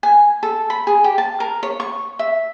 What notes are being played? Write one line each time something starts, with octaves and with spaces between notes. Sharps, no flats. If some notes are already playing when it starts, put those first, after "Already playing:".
G#5
A4
B5
G#4
G4
A5
A#4
C#5
C#6
E5